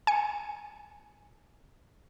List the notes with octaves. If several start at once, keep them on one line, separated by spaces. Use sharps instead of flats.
G#5 C#7